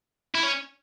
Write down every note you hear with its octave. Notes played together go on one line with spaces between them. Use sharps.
E4
C#4